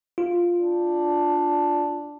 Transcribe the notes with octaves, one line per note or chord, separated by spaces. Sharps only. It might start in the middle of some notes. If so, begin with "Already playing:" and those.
F4
D4